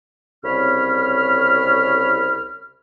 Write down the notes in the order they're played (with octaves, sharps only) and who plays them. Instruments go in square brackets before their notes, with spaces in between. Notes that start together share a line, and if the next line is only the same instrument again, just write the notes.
[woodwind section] C2 C#3 C4 C#5 B5 F6